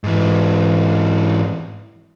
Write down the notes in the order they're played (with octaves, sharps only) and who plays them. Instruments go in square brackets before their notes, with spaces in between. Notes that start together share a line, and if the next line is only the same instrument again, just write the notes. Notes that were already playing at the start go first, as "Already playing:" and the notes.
[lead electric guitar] G#2 E3